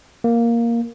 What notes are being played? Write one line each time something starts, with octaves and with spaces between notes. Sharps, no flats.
A#3